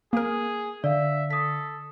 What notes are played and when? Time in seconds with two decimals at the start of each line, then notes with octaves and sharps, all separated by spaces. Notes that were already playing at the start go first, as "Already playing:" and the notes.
0.13 A#3 G#4 A#4
0.84 D3 D5 E5 F5
1.30 A4 D#6 B6